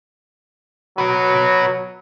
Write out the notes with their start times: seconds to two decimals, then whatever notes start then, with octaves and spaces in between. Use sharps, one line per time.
0.98 F#3 F#4 B4